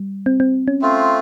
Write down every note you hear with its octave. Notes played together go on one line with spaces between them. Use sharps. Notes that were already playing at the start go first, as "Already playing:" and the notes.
Already playing: G3
C4
C4
C#4
A3 C4 F4